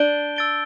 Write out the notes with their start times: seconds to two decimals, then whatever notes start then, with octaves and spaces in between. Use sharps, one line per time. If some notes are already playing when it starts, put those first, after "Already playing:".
Already playing: D4 A5 G6 D7 G7
0.36 E6 A6 D7 G7